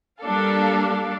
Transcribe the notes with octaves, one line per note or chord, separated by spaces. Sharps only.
G3 A#3 D4 A4 F5